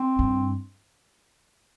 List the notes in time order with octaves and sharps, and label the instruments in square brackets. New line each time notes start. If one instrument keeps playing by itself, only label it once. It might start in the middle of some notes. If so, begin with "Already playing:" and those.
Already playing: [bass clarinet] C4
[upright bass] G2